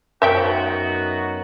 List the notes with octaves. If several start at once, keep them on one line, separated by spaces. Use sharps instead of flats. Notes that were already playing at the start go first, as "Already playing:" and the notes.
F#2 B3 D#4 F#4 C5 E5 G5